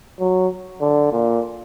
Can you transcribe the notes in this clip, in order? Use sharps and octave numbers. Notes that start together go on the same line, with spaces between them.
F#3
D3
A#2